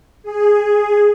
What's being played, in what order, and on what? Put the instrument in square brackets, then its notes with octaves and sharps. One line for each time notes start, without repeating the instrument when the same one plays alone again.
[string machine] G#4